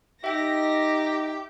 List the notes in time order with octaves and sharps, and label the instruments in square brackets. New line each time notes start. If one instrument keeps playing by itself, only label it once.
[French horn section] D#4 [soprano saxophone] G4 [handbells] E5 G5 [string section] A#6